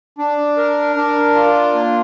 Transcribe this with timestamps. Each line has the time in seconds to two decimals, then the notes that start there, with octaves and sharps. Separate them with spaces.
0.18 D4
0.57 A#4
0.96 D4
1.35 F4
1.74 A#3